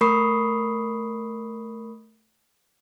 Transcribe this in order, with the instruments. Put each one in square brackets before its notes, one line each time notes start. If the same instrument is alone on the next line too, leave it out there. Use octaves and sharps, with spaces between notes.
[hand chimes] A3 A#4 B5 C#6 D#6 C7